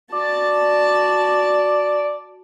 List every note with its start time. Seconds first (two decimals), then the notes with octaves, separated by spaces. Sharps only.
0.12 F#4 D5 A5